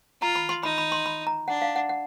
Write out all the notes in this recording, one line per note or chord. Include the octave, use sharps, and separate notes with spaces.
F4 A#5
B5
C6
D#4 B5
B5
C6
B5
A#5
D4 F#5
F5
F#5
F#5